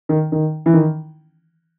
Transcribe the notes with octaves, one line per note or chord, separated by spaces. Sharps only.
D#3
D#3
E3
D#3